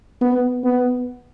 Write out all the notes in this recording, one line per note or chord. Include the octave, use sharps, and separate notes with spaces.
B3
B3